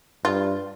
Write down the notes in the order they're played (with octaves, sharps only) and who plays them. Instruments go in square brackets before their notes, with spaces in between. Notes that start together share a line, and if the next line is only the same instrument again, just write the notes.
[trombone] G2 [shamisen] F4